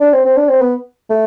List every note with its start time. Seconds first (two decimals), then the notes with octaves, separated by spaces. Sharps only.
0.01 D4
0.13 C4
0.25 C4
0.37 D4
0.49 C4
0.61 B3
1.10 A3